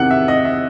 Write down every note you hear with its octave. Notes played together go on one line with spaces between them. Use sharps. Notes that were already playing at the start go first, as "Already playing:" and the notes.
Already playing: E2 C3 D#3 F#5
E5
D#5
E5